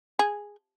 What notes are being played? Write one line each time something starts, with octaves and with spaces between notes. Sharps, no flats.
G#4